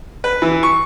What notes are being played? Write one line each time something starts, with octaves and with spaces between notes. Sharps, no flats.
B4
E3
C#6